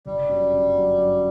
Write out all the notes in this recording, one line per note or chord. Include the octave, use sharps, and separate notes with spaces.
G1 G3
F#2
G1
F#3
F#2